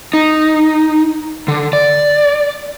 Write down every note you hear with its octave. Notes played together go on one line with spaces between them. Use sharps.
D#4
D3
D5